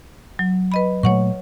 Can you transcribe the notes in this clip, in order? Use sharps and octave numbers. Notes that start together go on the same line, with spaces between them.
F#3
B4 D#5 B5
A#2 F#3 A3 C#5 F#5 C#6